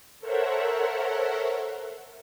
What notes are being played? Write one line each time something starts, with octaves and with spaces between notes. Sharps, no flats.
A4 A#4 C5 C#5 E5 F#5